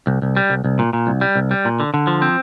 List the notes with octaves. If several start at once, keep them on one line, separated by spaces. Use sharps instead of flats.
C2
C2
G3
C2
C2
A#2
A#2
C2
G3
C2
G3
A#2
D3
D3
F3
C4